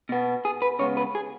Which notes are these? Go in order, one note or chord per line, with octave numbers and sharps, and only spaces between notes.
B2 B3
G#4
B4
C#3 G#3 B3 C#5
B4
G#4